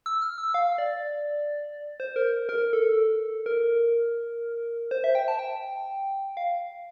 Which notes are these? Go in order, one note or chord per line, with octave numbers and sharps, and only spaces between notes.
E6
F6
E6
F5
D5
C5
A#4
A#4
A4
A#4
C5
E5
G5
A5
G5
F5